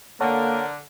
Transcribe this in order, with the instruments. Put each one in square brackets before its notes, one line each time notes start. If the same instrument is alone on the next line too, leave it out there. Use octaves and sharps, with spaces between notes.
[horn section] D3 [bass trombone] A#3 [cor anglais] A#4 [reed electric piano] C#5 F#5 A5